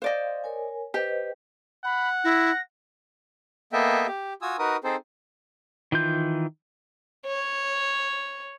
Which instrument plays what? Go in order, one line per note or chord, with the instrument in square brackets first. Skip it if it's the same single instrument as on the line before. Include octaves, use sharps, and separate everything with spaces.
[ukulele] C5 D5 D#5 [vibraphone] F5
[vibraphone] A#4 C#5 G#5
[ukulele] G4 [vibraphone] B4 C5 D#5
[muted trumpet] F#5 [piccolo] B5
[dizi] E4 [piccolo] A#6
[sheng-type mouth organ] A#3 B3 A4 D#5 E5 G5
G4
F4 F#4 G#5 D#6 E6
D#4 F#4 A#4 B4 D#6
C4 D#4 G#4 A4 C5
[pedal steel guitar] D#3 E3 F4 G6
[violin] C#5